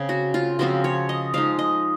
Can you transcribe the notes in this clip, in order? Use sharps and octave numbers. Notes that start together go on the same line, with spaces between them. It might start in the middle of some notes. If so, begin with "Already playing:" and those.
Already playing: C#3 C4
F#4
F4
C#3 F3 C4 F4 F#4
C#5
D#5
F3 G#3 D#4 F5
D#5